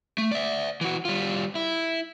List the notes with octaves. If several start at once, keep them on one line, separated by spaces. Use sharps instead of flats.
A3
D5 E5
E3 F#4
G3 F4
E4